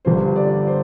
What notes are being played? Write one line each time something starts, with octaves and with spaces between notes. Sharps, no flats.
G1 G2 D3 F3 C5
D5
C5